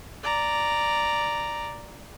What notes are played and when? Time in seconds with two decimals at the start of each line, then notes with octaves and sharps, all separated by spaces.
0.24 D5 A#5